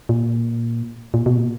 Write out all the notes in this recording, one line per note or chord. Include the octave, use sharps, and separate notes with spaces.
A#2
A#2
B2
A#2